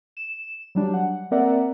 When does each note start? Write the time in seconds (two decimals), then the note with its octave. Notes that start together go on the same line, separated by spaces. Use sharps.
0.17 E7
0.75 F#3 G3 D4
0.94 F#5
1.31 A#3 C4 A#4 D5 E5 F#5